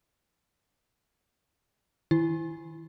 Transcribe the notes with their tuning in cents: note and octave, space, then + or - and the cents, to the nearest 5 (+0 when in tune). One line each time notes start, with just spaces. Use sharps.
D#3 +30 E4 +5